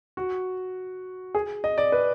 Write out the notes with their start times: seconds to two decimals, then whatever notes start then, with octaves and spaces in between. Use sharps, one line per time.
0.17 F#4
1.35 G#4
1.64 D#5
1.78 D5
1.92 B4